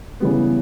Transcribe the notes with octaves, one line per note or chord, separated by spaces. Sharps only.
C#3 E3 G3 B3